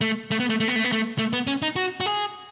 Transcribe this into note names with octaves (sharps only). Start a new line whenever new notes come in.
A3
A3
B3
A3
A3
B3
A3
B3
A3
A3
B3
C#4
D#4
F#4
F#4
G#4